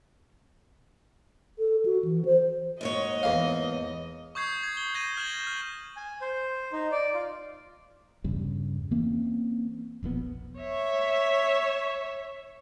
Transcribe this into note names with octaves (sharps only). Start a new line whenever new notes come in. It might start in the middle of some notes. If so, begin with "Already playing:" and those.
A4
F#4
E3
C5
D#2 G#2 C#5 D#5
E2 F5
C#6 D#6 G6 G#6 C7
G#6
G7
G6 A#6 D#7
F6 G#6 E7 F#7 G7
F6
G#5
C5
D#4
D5
F4
E2 G2 C#3 G3
E3 A#3 C4 C#4
E1 A#1 C3 B3
C#5 E5